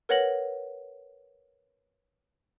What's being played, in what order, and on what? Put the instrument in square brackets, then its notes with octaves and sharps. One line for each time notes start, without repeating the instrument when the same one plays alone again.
[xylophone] A#4 B4 C#5 F#5 A#6 F#7